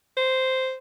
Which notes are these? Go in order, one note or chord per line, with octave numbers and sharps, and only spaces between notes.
C5